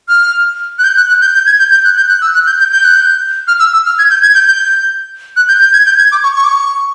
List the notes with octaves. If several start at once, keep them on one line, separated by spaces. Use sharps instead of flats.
F6
F#6
G6
F#6
F#6
G6
G6
G#6
G6
G6
F#6
G6
F#6
E6
F#6
G6
G6
G6
F#6
G6
F6
E6
E6
F6
G#6
G6
G#6
G6
G6
F#6
G6
G6
G#6
G6
G#6
D6
C#6
C#6
D6
C#6